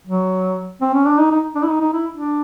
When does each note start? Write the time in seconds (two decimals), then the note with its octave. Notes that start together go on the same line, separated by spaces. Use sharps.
0.07 F#3
0.81 C4
0.94 C#4
1.06 D4
1.18 D#4
1.31 D#4
1.55 D4
1.63 E4
1.69 D#4
1.81 D#4
1.93 E4
2.12 D4